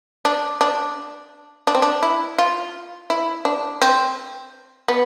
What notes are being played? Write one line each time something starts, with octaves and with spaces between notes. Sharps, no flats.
D4
D4
D4
C4
D4
E4
F4
E4
D4
C4
B3